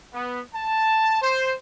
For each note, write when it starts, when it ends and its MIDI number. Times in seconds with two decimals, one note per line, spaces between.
0.14 0.40 59
0.53 1.18 81
1.21 1.53 72